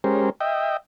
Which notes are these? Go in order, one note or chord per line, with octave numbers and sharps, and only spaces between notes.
G#3 C#4 G4 A#4 C5
D#5 E5 G5